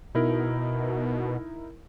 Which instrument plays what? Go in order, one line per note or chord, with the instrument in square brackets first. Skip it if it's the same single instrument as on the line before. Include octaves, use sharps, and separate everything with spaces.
[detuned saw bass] B2 [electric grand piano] D#4 E4 A#4